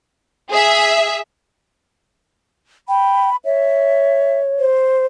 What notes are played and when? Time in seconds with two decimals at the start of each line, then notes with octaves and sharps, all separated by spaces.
0.50 G#4 E5
2.89 G5 B5
3.45 C#5 E5
4.59 C5